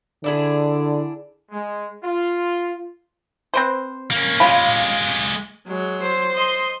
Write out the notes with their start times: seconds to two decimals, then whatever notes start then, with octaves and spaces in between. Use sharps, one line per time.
0.24 D3 D4 E4 G#4
1.51 G#3
2.04 F4
3.54 C4 B4 C5
4.11 A#3 C#4
4.40 C#3 G#3 F4 G4 B5
5.67 F#3 G#3
6.02 C5
6.35 D#5 C6